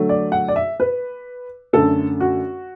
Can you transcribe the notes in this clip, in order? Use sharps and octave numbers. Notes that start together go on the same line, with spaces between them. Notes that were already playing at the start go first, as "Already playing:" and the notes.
Already playing: D3 F#3 A3
D5
F#5
D5
E5
B4
F#2 D3 A3 A4
F#4